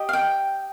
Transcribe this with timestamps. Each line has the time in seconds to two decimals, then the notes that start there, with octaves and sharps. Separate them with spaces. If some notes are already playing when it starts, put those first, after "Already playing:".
Already playing: G4 D#5
0.09 F5
0.13 G5